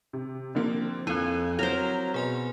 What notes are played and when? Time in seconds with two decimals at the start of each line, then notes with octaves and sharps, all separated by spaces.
0.13 C3
0.55 D3 F3 A#3 C4
1.07 F2 C4 E4 G#5 E6 F#6
1.59 F#3 A#4 C5
2.14 B2 G#4 G#5 C6